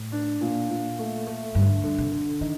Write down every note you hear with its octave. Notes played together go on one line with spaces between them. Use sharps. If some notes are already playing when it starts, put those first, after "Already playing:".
Already playing: A2
D4
A#2
A#2
A3
A3
G2 D3
D3
C3
D3
D#3 D#4